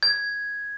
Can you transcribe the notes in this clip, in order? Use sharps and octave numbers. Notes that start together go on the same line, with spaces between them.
G#6